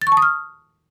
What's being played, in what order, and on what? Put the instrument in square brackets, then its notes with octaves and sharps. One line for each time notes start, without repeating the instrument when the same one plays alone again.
[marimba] A6
C#6
A5
D#6
F6